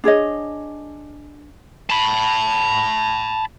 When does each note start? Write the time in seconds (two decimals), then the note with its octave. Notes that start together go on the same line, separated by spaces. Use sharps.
0.04 D4 G#4 C#5 D#5
1.90 A5 B5